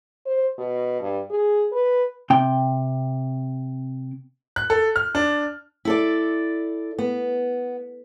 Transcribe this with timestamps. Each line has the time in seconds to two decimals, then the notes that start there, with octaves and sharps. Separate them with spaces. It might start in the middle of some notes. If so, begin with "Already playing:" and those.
0.26 C5
0.58 B2
1.00 G2
1.30 G#4
1.72 B4
2.30 C3 G5
4.56 F#6
4.70 A4
4.96 F6
5.15 D4
5.85 E4 A4 D5
6.99 B3